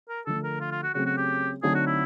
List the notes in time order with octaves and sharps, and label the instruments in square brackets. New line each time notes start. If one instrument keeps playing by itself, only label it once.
[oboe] A#4
[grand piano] D3 F3 A3 [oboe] A4
[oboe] A#4
F4
F4
F#4
[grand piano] C#3 F#3 A3 C4 [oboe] F#4
[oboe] F#4
G4
[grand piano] D3 F#3 A3 C4 D#4 [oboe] G#4
[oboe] F#4
E4